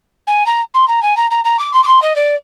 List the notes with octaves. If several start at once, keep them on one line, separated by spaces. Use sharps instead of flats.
G#5
A#5
C6
A#5
G#5
A#5
A#5
A#5
D6
C6
D6
C6
D#5
D5